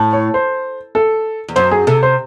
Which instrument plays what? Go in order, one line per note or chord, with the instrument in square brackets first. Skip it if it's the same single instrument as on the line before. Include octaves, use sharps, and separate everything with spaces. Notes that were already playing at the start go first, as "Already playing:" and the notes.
Already playing: [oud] A2
[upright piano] C#5
C5
A4
[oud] E2
[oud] F#2 [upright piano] C5
[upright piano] G#4
[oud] C3 [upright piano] A4
[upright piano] C5